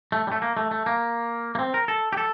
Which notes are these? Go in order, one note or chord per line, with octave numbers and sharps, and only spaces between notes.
A3
G3
A3
A#3
A3
A3
A#3
A#3
C4
A#4
A4
G4
A4